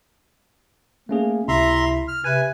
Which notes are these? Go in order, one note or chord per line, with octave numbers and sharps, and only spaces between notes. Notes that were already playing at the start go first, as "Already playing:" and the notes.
A3 A#3 C#4 G#4
C#2 C3 E4 E5 A#5 C6
F6
C3 B4 G#5 G#6